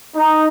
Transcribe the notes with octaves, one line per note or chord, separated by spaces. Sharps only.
D#4